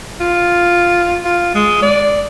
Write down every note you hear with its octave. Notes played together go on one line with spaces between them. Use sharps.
F4
F4
G#3
D5